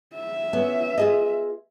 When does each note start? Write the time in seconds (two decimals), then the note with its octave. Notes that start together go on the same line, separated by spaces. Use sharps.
0.15 E5
0.53 B3 C#4
0.98 F4 G#4 D#5